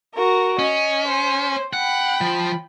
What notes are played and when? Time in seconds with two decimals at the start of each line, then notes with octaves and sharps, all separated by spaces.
0.15 F#4 A#4
0.59 C#4 D#5
1.07 C5
1.73 F#5 G5 B5
2.21 F3